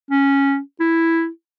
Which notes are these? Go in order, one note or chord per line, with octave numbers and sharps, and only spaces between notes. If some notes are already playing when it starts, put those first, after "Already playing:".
C#4
E4